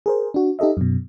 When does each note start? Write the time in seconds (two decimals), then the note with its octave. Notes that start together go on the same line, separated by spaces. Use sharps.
0.06 G#4 A#4 C5
0.34 D4 F#4
0.59 D#4 G4 A4 D#5 E5
0.77 F#2 B2